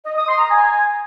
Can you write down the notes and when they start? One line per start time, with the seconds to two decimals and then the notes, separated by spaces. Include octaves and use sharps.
0.06 D#5
0.17 D#6
0.28 C6
0.40 A#5
0.51 G#5